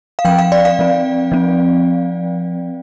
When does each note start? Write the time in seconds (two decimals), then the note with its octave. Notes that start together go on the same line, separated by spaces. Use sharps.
0.19 F5
0.25 F3 C4 G5
0.38 F5
0.52 D5
0.65 F5
0.79 F3 C4
1.32 F3 C4